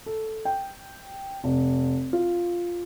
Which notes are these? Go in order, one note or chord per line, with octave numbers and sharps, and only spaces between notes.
A4
G5
F1
F4